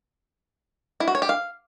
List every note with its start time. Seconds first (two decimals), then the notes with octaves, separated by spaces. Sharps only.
1.00 E4
1.08 F#4
1.15 C#5
1.22 G4
1.29 F5